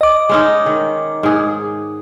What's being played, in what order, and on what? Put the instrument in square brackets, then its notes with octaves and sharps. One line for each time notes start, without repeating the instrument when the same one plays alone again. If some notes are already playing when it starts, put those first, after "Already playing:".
[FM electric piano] D#5 D6
[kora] G#3 C#4 D#4
D#3
G#2 G#4